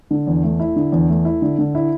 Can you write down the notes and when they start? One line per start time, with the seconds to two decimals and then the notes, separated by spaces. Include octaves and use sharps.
0.11 D3
0.27 E2
0.43 A3
0.60 E4
0.76 D3
0.92 E2
1.09 A3
1.25 E4
1.42 D3
1.58 D3
1.75 E4